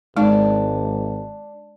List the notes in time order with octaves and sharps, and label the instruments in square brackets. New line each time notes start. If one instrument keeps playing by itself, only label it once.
[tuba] G#1 [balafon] G#3 D#4 [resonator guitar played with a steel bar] D4